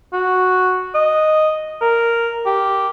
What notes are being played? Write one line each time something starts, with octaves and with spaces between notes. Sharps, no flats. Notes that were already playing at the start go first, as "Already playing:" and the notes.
F#4
D#5
A#4
G4